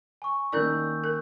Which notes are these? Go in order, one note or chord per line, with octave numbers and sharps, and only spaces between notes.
G#5 C#6
D#3 A#3 C#4 D#4 A#4 D5 E6 G6
A#4